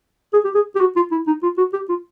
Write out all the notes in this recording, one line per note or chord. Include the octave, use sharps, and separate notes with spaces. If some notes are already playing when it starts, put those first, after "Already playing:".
G#4
G4
G#4
G4
F#4
F4
E4
D#4
F4
F#4
G4
F4